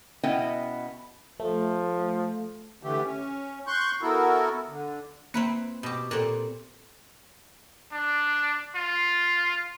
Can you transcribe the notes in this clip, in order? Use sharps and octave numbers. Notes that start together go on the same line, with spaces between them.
B2 B3 C#4 E4 D#5 G5
F3 A3
D3 E3 A3 G4
C#4
C6 C#6 F#6 G6
B3 E4 F#4 A4 A#4
D3
A#3 C4 E4 B4
B2 G4
A#2 C4 A4
D4
F4